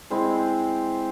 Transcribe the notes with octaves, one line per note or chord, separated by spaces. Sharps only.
G#3 C4 E4